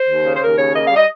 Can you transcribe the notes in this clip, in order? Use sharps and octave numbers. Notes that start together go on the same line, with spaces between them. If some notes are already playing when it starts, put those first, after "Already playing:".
Already playing: C5
D#2
C#3
C5
D#2 A#4
C#3 C#5
A#3 D#5
F5
G3
D#5